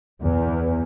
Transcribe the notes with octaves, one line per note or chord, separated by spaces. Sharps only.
E2